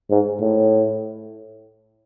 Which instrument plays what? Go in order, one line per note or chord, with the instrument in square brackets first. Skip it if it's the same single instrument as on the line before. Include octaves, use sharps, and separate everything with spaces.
[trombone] G#2
A2